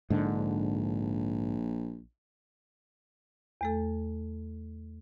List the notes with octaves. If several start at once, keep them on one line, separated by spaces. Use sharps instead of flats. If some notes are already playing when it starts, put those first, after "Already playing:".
A#1 G#2 D3
E2 A3 A4